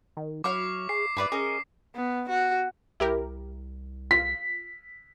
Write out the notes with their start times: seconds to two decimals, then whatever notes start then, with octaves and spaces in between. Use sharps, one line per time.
0.17 D#3
0.44 F#3 E4 C#5 F5 D6
0.89 G#4 C7
1.17 G2 E4 B4 D5
1.32 C#4 G#4 A#4 D#5
1.95 B3
2.29 F#4
3.00 C2 E4 G4 A#4
4.11 F4 B6